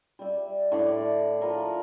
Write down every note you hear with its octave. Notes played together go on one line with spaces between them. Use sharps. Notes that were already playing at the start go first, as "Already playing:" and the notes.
G3 E5
A2 D3 D5
F3 A#4 B5